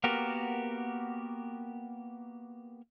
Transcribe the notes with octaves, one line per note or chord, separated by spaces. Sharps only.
A#3 B3 F#4 G4 A#4